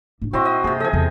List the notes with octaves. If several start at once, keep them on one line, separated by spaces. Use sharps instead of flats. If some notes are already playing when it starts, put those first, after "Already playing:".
A2 D4
A#2 C4 E4 F#4 D#5
D#5
G2 C3 A#3 G#4
C#3 F3 A4 D#5 G#5
E2 C3 A4